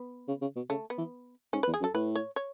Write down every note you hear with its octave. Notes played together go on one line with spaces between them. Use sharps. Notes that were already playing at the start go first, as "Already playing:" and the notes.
Already playing: B3
C#3
C#3
B2
C#3 A3
B3
E3
G#2 C#4
B4
E2
G#4
F#2
A4
A2 B4
C#5
C#5